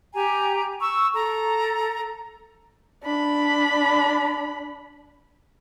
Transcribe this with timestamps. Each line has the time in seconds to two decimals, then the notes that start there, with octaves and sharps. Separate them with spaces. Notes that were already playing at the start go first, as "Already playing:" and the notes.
0.13 G4 G#5 A#5
0.80 C#6 E6
1.15 A4 A#5
3.03 D4 B5